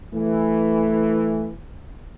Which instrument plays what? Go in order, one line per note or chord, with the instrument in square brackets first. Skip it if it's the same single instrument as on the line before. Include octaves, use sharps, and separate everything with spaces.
[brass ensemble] E3 [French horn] A3